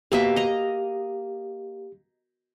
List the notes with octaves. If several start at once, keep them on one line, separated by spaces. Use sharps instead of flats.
B2 A#3 G4 E5
D#5 A#5